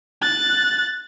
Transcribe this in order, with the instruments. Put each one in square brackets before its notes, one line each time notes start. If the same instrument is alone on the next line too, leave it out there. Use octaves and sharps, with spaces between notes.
[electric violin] F#6 A6